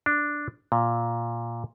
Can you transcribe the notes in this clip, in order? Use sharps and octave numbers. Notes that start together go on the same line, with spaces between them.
D4
A#2